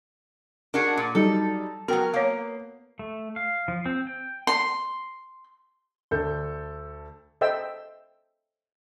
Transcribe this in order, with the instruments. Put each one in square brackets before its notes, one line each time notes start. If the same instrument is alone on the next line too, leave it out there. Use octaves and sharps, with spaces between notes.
[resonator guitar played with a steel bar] D4 F#4 G#4 [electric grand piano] A#4
[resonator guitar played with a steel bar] A#2
[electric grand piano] F#3 G3 D#4 [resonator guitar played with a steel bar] A4
[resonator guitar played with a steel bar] F#3 A#4 [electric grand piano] B3 [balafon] F#4 G5
[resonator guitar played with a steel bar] A#3 [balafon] C#5 F5
[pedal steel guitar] A3
F5
F3
C4
G5
[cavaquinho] C6
[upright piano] D2 D3 A4 G6
[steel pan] A4 C5 D#5 E5 G5 E6